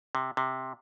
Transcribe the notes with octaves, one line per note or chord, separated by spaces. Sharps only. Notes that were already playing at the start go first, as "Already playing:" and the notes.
C3
C3